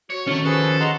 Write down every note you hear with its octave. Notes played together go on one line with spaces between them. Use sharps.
F#4 C#5
D#3 A3 C#4
F3 G#4 A4 B4
D#5 F#5 A#5 C6